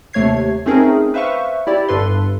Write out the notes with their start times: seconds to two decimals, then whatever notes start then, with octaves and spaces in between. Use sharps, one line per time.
0.13 D#2 C3 A3 C#5 G#6 C7
0.66 A3 C4 C#4 D#4 G#4 A#4
1.14 B4 C5 E5 F5 C#6
1.67 E4 G4 D5
1.89 G1 G2 A4 B4 C6